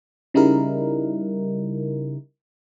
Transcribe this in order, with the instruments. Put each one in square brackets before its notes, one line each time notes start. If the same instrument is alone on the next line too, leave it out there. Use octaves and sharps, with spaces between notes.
[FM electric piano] C#3 G3 D#4 E4 A#4